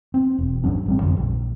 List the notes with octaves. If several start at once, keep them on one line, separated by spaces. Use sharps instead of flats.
C4
E1
G#1 F#3 C#4 D4
A1 G3 C4
F2 D3 F#3 G#3
A#1